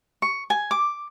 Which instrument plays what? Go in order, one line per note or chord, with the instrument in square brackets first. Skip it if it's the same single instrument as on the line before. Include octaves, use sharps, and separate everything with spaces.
[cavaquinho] C#6
G#5
D6